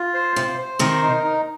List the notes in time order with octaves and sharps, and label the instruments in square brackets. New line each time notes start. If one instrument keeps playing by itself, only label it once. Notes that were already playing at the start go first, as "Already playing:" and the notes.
Already playing: [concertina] F4
C5
[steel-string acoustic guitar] C3 [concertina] C5
[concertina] C5
[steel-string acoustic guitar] C3 D#3 [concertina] A#4
[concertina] D#4
D#4